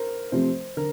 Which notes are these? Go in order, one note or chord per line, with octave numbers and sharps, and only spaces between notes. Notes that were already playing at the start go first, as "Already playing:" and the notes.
Already playing: A#4 C5
C3 F3 A3 C4 C5
D3 A#4